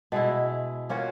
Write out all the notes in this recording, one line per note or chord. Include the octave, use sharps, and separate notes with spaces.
B2 G#3 E4
A#3 C#4 F4 F#4